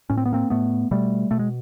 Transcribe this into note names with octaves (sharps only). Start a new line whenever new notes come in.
A2 C#4
C4
B3
A#3 C4
A2 A3 B3
B2 G3 A3
B2 A3
G#3